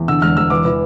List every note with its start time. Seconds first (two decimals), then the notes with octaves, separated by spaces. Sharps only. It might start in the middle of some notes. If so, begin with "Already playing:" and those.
Already playing: E2
0.08 D3 E6
0.22 E1 F6
0.37 E1 E6
0.50 E3 D6
0.65 E3